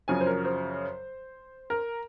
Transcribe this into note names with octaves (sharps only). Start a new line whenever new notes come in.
F#2 C#3 F3 G#5
C5
A#4
C5
A#4